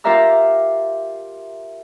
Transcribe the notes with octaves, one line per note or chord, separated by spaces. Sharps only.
F4 G4 A#4 E5 A#5 F6